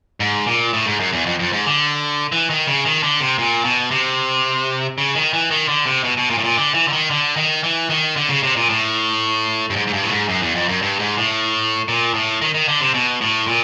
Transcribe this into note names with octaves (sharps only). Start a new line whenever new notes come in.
G#2
A#2
A2
G#2
F#2
E2
F2
F2
G#2
D3
E3
D#3
C#3
D#3
D3
C3
A#2
B2
C3
C#3
D#3
E3
D#3
D3
C3
B2
B2
A#2
A2
A#2
D3
E3
D3
D#3
D3
D#3
E3
D#3
D3
C#3
C3
A#2
A2
G2
G#2
G#2
G2
A2
G#2
F#2
E2
F2
F#2
G2
G#2
A2
A#2
A2
D#3
D#3
D3
C3
B2
A2
A#2